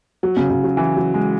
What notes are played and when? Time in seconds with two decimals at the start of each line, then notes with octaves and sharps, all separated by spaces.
0.23 F#3
0.37 C#3
0.50 C#3
0.64 F#3
0.77 E3
0.97 F#3
1.14 G#3